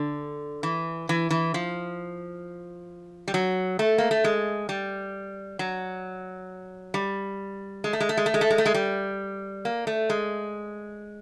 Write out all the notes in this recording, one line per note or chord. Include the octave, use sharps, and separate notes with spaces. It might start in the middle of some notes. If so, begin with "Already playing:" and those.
Already playing: D3
E3
E3
E3
F3
G3
F#3
A3
A#3
A3
G#3
G3
F#3
G3
G#3
A3
G#3
A3
G#3
A3
G#3
A3
G#3
A3
G#3
G3
A#3
A3
G#3